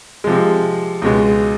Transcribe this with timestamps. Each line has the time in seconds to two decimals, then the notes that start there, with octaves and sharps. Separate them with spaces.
0.24 C3 F3 G#3
1.02 C#2 B2 G#3